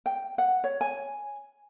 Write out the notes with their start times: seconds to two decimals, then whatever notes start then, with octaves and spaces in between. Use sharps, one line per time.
0.06 G5
0.38 F#5
0.64 C#5
0.81 G#5